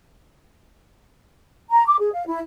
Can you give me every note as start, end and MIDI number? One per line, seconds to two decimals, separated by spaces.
1.70 1.84 82
1.86 1.96 86
1.99 2.11 68
2.13 2.23 77
2.27 2.39 64